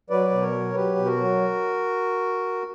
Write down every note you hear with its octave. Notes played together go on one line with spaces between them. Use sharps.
F#3 B4 D5
B2
A#4 C#5
F#3
F#3 G4 B4
B2
F#4 A#4
F#3